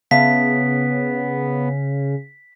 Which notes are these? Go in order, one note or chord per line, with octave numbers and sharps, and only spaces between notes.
C#3 B3 E5 F5 A5 B6